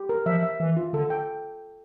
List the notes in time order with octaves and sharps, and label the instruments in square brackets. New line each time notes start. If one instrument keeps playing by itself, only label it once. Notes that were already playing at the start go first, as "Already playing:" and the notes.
Already playing: [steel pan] G4
A#4
[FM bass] F3 [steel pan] E5
[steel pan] E5
[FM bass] E3 [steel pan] E5
[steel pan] F4
[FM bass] D3 [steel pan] A4
[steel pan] G5